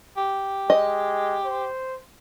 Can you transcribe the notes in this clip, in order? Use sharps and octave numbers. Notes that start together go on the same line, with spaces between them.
G4
G#3 D#5
C5